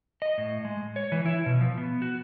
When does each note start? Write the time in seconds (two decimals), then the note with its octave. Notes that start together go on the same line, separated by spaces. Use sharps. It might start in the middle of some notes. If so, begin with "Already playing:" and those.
0.22 D#5
0.38 A2
0.65 G#3
0.96 C#5
1.12 E3
1.26 E4
1.46 B2
1.61 F3
1.78 B3
2.02 F#4